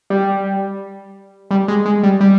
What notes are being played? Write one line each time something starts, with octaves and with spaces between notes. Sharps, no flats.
G3
G3
G#3
G#3
G3
G3